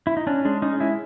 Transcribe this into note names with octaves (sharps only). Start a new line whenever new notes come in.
E4
D#4
C#4 D4
G#3 D4
C#4 D#4
G#3 E4